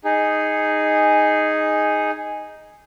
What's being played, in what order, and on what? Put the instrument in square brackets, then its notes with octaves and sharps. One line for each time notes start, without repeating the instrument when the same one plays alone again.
[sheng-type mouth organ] D#4 G#4